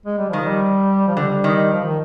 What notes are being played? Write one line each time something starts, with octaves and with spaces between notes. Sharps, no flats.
G#3
G3
D#3 F3
G3
F3
D3 G3
D#3
F3
D#3